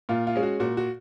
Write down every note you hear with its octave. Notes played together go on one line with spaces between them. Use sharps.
A#2 F4
F4
G#3 C#4
F#4
A#2 F#4
F#4